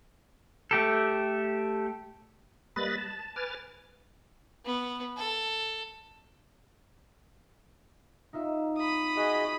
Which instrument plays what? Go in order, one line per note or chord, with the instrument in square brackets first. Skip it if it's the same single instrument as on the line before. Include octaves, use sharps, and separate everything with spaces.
[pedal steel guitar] A3 G4 A4
[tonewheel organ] G3 A#3 B4 D#5 B5 A6
A5
B4 G#5 D6 F6 A6
[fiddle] B3
A4
[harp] D#4 F4 E5
[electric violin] B5 D#6
[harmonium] F#4 G#4 D#5 [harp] F#5 C6